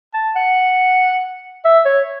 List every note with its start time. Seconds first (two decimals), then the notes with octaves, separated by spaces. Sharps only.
0.14 A5
0.36 F#5
1.65 E5
1.85 C#5